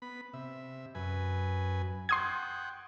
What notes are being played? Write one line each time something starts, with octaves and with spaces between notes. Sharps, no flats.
B3 B5
C3 E5
F#2 B4 G#5
F#5 G5 C6 D#6 G#6